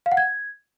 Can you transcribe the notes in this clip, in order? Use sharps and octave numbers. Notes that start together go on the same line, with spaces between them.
F5
F#5
G#6